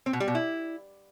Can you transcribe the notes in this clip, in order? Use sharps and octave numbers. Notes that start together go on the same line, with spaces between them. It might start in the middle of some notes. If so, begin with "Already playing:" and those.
C4
B2
G3
B2
E4